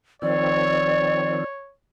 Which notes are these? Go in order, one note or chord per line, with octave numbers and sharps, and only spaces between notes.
D#3 F3 C4 C#5 D5